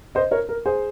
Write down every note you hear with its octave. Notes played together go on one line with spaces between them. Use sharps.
C5 D#5
A#4 C#5
A#4
G#4 C5